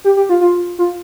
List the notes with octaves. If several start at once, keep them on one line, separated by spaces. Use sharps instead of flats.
G4
G4
F4
F4
F4